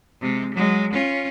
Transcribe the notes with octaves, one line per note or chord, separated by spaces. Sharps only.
C3 G#3
F#3 G#3
C#4 F4